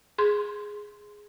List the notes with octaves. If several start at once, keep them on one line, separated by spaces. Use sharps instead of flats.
G#4 C6